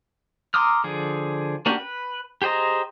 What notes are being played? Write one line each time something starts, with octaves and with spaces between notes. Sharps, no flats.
A#5 C6 D6 D#6 F6
D3 F3 G#4
A#3 C#4 D4 F#4 G4
B4
G4 G#4 C5 D#5 A#5